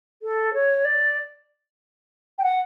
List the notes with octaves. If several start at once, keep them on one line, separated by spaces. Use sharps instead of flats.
A4
C#5
D5
G5
F#5